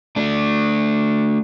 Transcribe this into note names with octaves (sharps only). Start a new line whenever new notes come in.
A3 D4